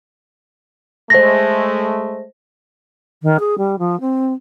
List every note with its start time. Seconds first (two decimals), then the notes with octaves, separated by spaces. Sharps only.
1.10 G#3 A3 C5 A#6
3.22 D#3
3.39 G#4
3.58 G3
3.79 F3
4.00 C4